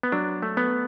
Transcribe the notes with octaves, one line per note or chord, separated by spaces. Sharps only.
B3
F#3 D4
A3
B3